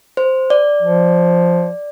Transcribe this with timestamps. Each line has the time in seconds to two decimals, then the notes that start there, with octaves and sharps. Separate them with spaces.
0.17 C5
0.50 D5
0.83 F3